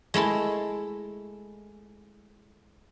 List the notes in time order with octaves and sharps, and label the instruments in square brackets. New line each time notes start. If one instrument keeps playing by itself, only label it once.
[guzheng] G#3 A3 E4 A4